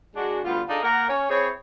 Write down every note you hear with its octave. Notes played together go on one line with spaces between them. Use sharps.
G#3 D4 F#4
D2 G3 B3 F4
D4 D#4 F4 G#4 A4 D5
A#3 A#4 F#5
C#4 C#5
C4 E4 G#4 C#5